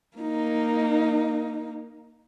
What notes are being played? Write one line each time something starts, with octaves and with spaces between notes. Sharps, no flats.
A#3 D#4